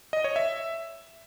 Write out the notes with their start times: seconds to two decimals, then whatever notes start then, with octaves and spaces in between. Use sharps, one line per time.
0.13 D#5
0.24 C#5
0.36 E5